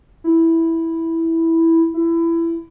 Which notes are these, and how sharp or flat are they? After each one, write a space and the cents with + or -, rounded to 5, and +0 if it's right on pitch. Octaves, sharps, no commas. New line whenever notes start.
E4 -5
E4 +20